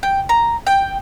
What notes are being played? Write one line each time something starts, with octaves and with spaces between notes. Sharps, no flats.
G5
A#5
G5